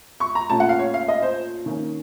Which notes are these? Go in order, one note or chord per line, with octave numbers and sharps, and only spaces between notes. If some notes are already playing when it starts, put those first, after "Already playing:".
C#6
A#5
A#2 A3 C#4 A5
F#5
F5
C#5
F5
D#5
C5
D#3 A#3 C#4